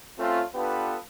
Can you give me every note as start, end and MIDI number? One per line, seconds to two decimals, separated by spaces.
0.19 0.41 57
0.19 0.41 60
0.19 0.41 61
0.19 0.41 65
0.55 0.96 59
0.55 0.96 62
0.55 0.96 65
0.55 0.96 67
0.55 0.96 69
0.55 0.96 71